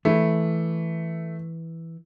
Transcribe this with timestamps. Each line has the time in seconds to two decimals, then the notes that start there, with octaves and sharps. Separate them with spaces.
0.05 E3 A3